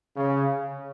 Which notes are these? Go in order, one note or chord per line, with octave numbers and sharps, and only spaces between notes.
C#3